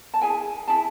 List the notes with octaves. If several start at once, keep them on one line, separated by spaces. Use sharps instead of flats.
A5
E4 G#4 G#5
E4 G#4 A5